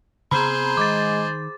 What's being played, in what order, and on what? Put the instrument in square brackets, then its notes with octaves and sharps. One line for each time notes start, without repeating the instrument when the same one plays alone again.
[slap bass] C3 B3 C4 [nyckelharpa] G#4 C5 [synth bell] A#5 B5
[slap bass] D#3 [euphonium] G#3 [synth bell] D6 A6